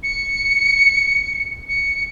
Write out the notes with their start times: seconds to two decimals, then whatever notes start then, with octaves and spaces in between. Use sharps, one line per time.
0.03 C#7
1.69 C#7